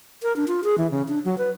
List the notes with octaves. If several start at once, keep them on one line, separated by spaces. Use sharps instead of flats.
A#4
D4
F4
G#4
E3
C#3
D4
F#3
B4